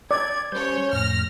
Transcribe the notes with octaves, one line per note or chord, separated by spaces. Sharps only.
D5 G#6
G3 C#4 C5 C#5 G6
F2 A2 F6 A#6